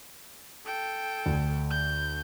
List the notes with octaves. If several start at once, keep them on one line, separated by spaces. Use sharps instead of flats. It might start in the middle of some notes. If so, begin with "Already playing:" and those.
A4 G5
D2
G6